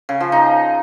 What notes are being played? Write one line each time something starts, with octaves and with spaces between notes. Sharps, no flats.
C#3
F3
D#4